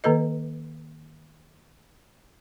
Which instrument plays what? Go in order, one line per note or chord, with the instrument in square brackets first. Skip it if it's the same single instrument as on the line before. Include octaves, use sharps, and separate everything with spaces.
[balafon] D#3 A#3 A4 B4 D#5